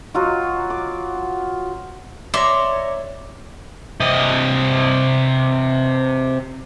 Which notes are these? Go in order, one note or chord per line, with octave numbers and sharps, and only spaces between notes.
F#3 F4 F#4
D6
C#5 D5 E5 A#5 C6
C3 D#5